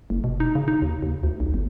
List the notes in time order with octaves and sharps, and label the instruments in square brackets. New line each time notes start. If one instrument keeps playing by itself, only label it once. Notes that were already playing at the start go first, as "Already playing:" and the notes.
[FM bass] F#1
B2
D#4
C#3
D#4
D#2
D#2
D2
B1
G1